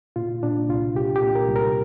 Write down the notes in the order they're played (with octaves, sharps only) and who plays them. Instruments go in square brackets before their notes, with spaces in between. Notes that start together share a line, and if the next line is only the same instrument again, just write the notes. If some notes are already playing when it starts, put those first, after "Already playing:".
[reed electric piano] A#2 F4
A#2 D4
C2 F4
C2 G4
G4
A#2
A#4
C2
A#4